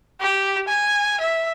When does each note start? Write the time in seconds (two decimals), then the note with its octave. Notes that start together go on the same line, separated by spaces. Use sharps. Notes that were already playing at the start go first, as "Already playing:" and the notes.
0.21 G4
0.68 G#5
1.20 E5